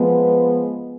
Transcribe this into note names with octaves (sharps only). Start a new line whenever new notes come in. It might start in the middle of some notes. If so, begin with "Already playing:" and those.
Already playing: F3 G#3 B3